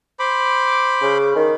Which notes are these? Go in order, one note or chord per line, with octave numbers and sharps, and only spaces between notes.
C5 B5 D6
C#3
D#3